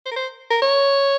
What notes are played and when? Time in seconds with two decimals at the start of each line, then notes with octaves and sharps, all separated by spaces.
0.06 C5
0.11 A#4
0.16 C5
0.50 A#4
0.62 C#5